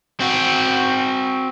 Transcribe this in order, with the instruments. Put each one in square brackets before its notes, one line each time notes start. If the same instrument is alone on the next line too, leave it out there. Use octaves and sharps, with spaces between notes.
[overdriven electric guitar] C4 F#4